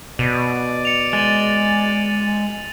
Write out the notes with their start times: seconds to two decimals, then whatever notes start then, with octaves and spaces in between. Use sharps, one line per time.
0.19 B2 D5 D#7
0.85 C#7 F7
1.13 G#3 A6 D#7 F#7